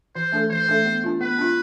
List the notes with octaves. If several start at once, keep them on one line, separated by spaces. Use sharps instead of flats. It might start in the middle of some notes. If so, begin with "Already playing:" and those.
E3 C5
A3 D4 A4
E3 C5
A3 D4 A4
B3
D4 F4
B3 B4
D4 F4